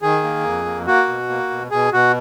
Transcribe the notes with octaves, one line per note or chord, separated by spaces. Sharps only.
D#3 G#4
A#3
F2
A#3
A#3 F#4
B2
A#3
B2
B2 G#4
B2 F#4